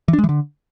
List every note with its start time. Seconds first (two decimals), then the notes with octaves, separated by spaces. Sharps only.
0.08 E3
0.13 D4
0.19 G#3
0.24 E3
0.29 D3